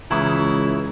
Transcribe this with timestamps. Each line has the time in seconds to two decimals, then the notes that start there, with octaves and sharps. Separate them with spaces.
0.11 C#2 C#3 E3 E4 A#5 C#6 D#6